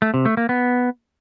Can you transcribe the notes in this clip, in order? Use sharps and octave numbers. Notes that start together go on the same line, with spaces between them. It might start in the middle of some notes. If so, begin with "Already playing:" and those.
A3
C3
A3
A#3
B3